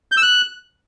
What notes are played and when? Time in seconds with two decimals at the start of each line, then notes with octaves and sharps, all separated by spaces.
0.12 G6
0.17 E6
0.23 F#6